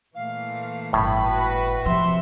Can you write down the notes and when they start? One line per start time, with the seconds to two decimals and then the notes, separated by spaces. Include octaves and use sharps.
0.15 A#2 E3 A3 F5
0.93 G1 A2 B5
1.26 F#4 B4
1.86 C3 F3 E5 C6